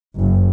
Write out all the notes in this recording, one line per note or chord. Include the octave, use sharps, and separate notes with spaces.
F#1